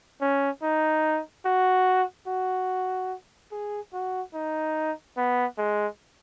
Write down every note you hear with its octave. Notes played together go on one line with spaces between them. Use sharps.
C#4
D#4
F#4
F#4
G#4
F#4
D#4
B3
G#3